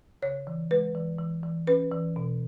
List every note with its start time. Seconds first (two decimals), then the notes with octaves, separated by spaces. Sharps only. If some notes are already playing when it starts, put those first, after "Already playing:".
0.22 C#3 C#5
0.47 E3
0.71 G#3 B4
0.95 E3
1.19 E3
1.43 E3
1.67 C#4 B4
1.92 E3
2.16 B2